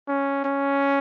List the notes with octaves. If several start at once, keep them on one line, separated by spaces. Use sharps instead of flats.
C#4
C#4